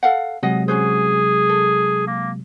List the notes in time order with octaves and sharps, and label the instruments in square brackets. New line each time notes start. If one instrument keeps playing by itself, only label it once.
[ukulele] A4 F5 F#5
[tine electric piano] C3 F#3 G#3 [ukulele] G#4 D#5 F#5
[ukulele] C#4 F#4 C5 [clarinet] G#4
[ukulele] A4
[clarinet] A#3